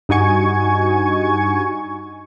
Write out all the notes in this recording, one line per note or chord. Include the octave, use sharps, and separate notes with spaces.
G2 D#4 F#4 G#5 C#6 G#6